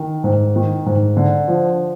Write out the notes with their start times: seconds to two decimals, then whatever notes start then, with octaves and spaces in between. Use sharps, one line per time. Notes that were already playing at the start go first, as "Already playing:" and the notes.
Already playing: D#3
0.24 G#2
0.56 D#3
0.86 G#2
1.17 D3
1.48 F3